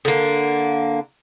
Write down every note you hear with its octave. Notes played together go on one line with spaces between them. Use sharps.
D3 A#3